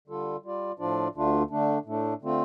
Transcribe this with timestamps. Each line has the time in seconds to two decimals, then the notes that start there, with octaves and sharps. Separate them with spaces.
0.08 D3 G3 F4 A4
0.43 G3 F4 D5
0.79 A2 F3 D4 F4 D5
1.15 D2 D3 A3 D4 F4
1.50 D3 A3 D4
1.85 A2 A3 D4
2.22 D3 A3 C4 F4